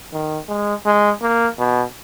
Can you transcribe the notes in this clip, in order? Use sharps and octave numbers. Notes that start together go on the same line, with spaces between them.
D#3
G#3
G#3
A#3
B2